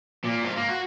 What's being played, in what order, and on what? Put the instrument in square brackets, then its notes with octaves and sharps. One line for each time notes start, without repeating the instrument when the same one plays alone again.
[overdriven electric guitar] A#2
G#2 F4
A#3
F#4